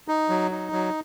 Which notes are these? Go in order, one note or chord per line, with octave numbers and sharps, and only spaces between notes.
D#4
F#3
D#4
F#3